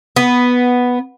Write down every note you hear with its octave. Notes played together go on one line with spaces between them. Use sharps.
B3